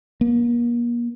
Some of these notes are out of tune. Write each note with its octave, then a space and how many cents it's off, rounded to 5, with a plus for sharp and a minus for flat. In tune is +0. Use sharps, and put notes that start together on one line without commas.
A#3 +35